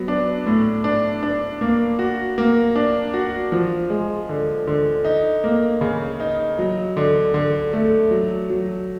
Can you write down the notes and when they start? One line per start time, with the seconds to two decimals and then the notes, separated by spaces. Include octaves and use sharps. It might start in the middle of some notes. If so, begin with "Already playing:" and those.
Already playing: F#3 B3
0.08 D4
0.46 A2
0.84 D4
1.23 D4
1.61 A#3
1.99 F#4
2.38 A#3
2.76 D4
3.14 F#4
3.52 F3
3.90 G#3
4.29 D3
4.67 D3
5.05 D#4
5.44 A#3
5.81 C#3
6.20 D#4
6.59 F#3
6.97 D3
7.34 D3
7.73 A3
8.11 F#3
8.50 F#3